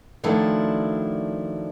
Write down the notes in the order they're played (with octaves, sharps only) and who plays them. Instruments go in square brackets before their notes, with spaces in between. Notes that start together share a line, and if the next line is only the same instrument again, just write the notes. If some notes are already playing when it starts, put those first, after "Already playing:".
[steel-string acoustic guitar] D#3 F3 F#3 A3 D4 E4